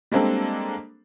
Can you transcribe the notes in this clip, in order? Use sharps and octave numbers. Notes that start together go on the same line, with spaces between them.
G3 G#3 A#3 C4 D4 A4